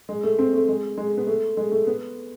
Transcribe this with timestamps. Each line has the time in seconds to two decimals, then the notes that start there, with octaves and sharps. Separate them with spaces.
0.09 G#3
0.23 A3
0.39 C4
0.53 A3
0.68 G#3
0.98 G#3
1.17 B3
1.27 A3
1.57 G#3
1.72 A3
1.87 B3